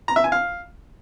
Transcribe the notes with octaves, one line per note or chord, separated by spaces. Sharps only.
A#5
E5
G#5
F5